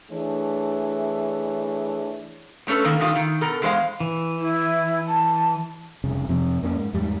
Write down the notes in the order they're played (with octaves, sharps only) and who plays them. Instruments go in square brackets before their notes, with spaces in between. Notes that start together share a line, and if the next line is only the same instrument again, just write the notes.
[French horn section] E3 A3 D4 G#4 C#5
[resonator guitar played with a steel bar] F#3 A3 C#4 A4 B4
D#3 A#3 A#4
A2 D#3 G3 D4 F4
D#3
B2 A4 A#4
E2 G#3 C5 D#5 F5
[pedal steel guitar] E3
[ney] E4
A5
[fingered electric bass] F1 C2 C#3
F2 C3 F3 C4
F2 A#3 C4 C#4
G#2
E2 G#2 G3